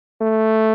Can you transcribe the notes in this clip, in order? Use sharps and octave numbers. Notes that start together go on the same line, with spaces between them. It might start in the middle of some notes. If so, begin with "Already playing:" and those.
A3